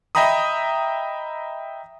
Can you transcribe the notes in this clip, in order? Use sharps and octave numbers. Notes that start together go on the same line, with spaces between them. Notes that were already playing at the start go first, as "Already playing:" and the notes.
D#5 E5 G5 A#5 B5 D#6